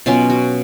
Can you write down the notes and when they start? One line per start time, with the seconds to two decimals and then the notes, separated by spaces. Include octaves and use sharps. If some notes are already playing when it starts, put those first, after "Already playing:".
0.06 B2 F#3 C#4 F4
0.30 F#4